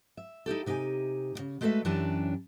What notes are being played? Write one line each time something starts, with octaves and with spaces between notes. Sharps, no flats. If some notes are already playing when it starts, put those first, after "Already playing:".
E5
D#4 E4 G4 A4
C3 D#4 G4 E5 G#5
D#2 C#3
G#3 A3 F#4 A4 B4 E5
F#2 E3 C#4 D4 G4 A5